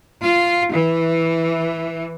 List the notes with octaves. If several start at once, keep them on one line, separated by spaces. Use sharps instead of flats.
F4
E3